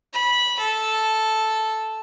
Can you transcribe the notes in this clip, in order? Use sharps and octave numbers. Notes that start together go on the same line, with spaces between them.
B5
A4